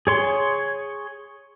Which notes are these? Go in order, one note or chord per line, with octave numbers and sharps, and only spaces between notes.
G#4 C#5 C6